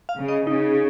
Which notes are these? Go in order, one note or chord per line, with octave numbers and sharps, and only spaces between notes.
F5
C#3
D#5
C#3 D#4